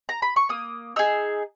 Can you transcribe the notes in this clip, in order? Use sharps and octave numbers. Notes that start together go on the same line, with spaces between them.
A#5
B5
C#6
A#3 D#6
D#4 G#4 E6